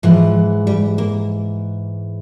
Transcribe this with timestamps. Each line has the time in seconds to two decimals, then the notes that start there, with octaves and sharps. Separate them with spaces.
0.03 G#2 E3 F3
0.67 G3
0.98 A#3